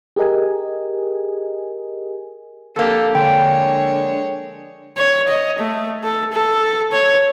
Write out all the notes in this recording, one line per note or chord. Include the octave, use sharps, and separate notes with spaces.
G4 G#4 A#4 D#5 G#5
F2 A#3 D4 G4 A4
D3 G#3 C#5 G5
C#5
D#5
A3
A4
A4
C#5